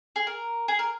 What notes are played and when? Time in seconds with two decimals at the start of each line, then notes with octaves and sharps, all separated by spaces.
0.16 G#4
0.27 A#4
0.68 G#4
0.79 A#4